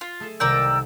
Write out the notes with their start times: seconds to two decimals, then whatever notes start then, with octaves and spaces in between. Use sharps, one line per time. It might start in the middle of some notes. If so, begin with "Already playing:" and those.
0.01 F4
0.20 A3 G#4 A4
0.40 C2 C3 D#3 A#4 D5 G5 E6